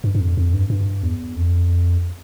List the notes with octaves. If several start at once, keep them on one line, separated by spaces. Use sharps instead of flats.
G2
G2
F2
F2
G2
G2
E2
F2